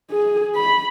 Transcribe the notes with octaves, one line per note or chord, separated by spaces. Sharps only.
G#4
B5